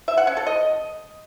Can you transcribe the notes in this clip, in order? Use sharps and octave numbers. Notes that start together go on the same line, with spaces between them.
E5
F#5
C#4
A4
D#5